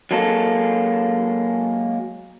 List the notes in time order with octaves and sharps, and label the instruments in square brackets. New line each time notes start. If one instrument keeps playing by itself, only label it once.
[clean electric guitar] F#3 G#3 A#3 A4